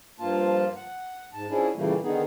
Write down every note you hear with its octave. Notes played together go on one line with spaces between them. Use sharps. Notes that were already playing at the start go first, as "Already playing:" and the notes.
G2 F3 A#3 F4 A5
F#5
G#2 A5
F3 C#4 D4 E4 G#4
A#2 C#3 E3 G3 A3 A#3
D3 D#3 B3 D#4 G#4